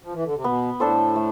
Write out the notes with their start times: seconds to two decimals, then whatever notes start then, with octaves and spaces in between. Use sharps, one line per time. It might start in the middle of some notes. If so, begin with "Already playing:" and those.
0.03 F3
0.13 E3
0.24 D3
0.34 C3
0.44 B2 B3
0.80 A2 D4 A4 C5
1.16 A3